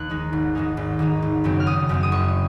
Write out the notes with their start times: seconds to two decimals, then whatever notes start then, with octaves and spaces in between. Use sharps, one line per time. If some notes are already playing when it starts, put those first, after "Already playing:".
Already playing: D#2 F#6
0.10 D#3 G#3 D#4
0.33 G#1
0.55 G#2 D#3 G#3 D#4
0.77 G#1
0.99 G#2 D#3 G#3 D#4
1.22 G#1
1.44 F#2 C#3 F#3 C4
1.60 F6
1.66 G#1 D#6
1.89 F#2 C#3 F#3 C4
2.03 D#6
2.12 F#1 C#6